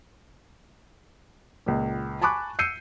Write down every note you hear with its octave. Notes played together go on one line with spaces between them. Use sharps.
C#2 A#2
G#5 A5 B5 C#6 D6 F#6
E6 G6 C7 C#7 D#7